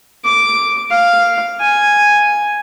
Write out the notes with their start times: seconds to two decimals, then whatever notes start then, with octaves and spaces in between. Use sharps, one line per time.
0.25 D6
0.90 F5
1.61 G#5